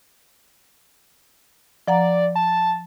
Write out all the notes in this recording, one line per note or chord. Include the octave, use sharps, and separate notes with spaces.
F3 D5 F#5 A#5
A5